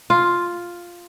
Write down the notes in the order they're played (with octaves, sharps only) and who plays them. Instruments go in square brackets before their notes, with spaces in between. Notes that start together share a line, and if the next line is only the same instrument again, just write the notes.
[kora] F4